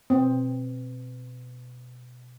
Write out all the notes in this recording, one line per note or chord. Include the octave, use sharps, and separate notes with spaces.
B2 C4